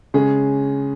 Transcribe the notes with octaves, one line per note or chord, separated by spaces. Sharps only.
C#3 G#3 C#4 G#4